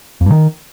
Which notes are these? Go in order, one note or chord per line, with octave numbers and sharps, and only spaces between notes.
F2
G2
D#3